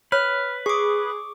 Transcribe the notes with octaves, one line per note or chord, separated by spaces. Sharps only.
B4 C#5 F6
G#4 C#6 D6